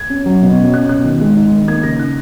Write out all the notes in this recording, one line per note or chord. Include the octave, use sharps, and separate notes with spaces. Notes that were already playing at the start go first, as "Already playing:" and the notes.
Already playing: G#6
C#4
F#3
B2
C#4
C#4 F#6
B2 F#6
D#3
G#3
D#4
D#3
A#3 G#6
C#3 A#6
D#4 F#6